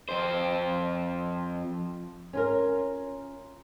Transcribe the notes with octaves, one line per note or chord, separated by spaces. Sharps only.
F2 C5
C#4 F4 A#4